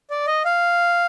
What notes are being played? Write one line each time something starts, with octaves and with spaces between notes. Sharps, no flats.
D5
D#5
F5